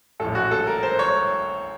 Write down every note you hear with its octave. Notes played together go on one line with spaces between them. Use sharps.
A#1 A2 A4
F#4
A4
A#4
C5
C#5